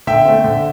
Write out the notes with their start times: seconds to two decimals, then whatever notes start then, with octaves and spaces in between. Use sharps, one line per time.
0.07 D3 E5 G5
0.25 A3 C4
0.44 D3